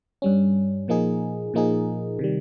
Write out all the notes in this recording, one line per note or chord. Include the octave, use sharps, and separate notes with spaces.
G2 G3 C#4
A#2 F3 A#3 D#4 G#4
A#2 F3 A#3 D#4 G#4
C3 D#3 G3